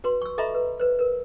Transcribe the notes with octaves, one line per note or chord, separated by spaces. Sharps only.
F#4 B4 C6
C#6 E6
A4 D#5 E5 A#5 B5 C#6
B4
B4 C5
A#4 B4